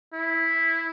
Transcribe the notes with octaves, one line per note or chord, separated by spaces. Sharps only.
E4